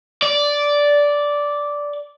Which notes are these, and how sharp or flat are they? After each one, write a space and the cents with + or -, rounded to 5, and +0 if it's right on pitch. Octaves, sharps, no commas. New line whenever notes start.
D5 -10